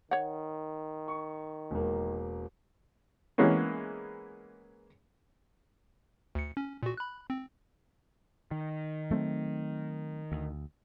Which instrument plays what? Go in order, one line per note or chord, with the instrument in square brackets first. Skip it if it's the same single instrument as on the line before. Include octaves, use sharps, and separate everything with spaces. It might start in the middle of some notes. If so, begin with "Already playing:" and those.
[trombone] D#3 [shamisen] C#5 F#5
[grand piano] C#6
E1 A#3
[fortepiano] E3 G#3 A#3 B3 C#4
[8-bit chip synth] D2 C#7
C#4
A#2 F#4
B5 F#6
C4
[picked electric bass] D#3
[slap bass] F#3 A3 C4
D2